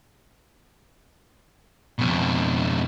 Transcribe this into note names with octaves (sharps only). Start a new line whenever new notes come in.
F2 B2